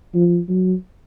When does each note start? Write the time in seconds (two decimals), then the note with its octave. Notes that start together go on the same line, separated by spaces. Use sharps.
0.15 F3
0.49 F#3